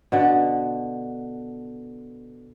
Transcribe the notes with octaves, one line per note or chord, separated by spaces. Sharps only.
B2 D3